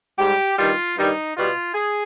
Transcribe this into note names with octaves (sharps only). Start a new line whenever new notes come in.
G#2 G3 G4
G2 D#3 G3 F4
G2 D#3 G3 D#4
B2 G3 F4
G#4